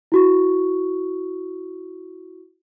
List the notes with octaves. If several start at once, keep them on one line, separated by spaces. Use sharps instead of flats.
E4 F#4 C#6